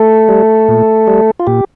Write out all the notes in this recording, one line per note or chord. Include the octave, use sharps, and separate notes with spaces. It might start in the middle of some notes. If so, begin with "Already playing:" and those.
Already playing: A3 A4
G3
A#2
G3
F4
A#2 G4